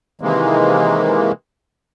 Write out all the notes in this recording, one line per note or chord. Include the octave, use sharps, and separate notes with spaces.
C3 D#3 E3 G#3 A#3